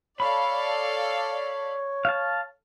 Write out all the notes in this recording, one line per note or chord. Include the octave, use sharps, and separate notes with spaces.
A4 C#5 D5 F5 B5
F5 A5